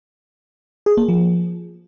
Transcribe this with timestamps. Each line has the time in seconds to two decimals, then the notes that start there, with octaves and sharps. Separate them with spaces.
0.86 G#4
0.97 A#3
1.09 F3